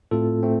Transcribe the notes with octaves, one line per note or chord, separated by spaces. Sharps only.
A2 A3 C4 F4 A4
A3 C4